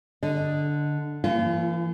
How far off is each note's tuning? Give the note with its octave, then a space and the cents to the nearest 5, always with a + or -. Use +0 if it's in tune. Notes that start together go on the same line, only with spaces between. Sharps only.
D3 +0 D#5 +0
E3 +40 A#3 -20 F4 -25